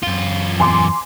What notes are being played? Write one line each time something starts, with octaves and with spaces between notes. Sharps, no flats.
F#2 F4
E2 G#5 C6 D6